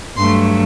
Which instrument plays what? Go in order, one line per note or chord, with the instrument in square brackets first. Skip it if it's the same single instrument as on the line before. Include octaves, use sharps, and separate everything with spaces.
[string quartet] G2 F#3 A3 C6